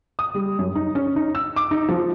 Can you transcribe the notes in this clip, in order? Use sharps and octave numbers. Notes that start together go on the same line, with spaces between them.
D#6
G3
F#2
D#4
C#4
D#4
E6
D6
D#4
F3